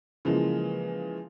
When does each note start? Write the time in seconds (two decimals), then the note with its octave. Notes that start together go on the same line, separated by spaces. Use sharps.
0.25 C#3 E3 F3 G#3 A#3